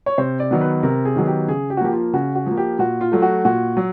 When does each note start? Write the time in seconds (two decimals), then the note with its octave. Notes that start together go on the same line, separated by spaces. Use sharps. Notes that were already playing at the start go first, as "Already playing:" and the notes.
0.06 C#5
0.18 C3 C5
0.40 D5
0.51 D#3 F#3 B3
0.61 B4
0.83 C3 A#4
1.05 G#4
1.16 D#3 F#3 B3
1.27 G4
1.48 C#3 G#4
1.70 G4
1.77 F#4
1.81 F3 A#3 G4
1.93 F4
2.13 C#3 F#4
2.36 F#4
2.46 F3 A#3
2.57 G4
2.79 A#2 F#4
3.01 F4
3.12 F#3 A3
3.22 F#4
3.45 A#2 F#4
3.77 F#3